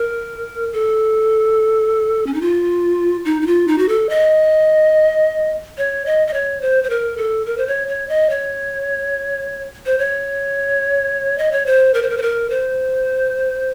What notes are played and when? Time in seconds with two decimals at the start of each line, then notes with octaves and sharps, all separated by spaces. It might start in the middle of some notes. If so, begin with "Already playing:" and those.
Already playing: A#4
0.73 A4
2.27 C#4
2.34 D#4
2.41 F4
3.25 D#4
3.42 D#4
3.47 F4
3.68 D#4
3.78 F#4
3.89 A4
4.10 D#5
5.78 C#5
6.06 D#5
6.27 D#5
6.34 C#5
6.62 C5
6.84 C5
6.90 A#4
7.18 A4
7.46 A#4
7.58 C5
7.67 C#5
7.88 C#5
8.09 D#5
8.30 C#5
9.86 C5
9.99 C#5
11.38 D#5
11.52 C#5
11.66 C5
11.94 A#4
12.02 C5
12.10 A#4
12.18 C5
12.22 A#4
12.50 C5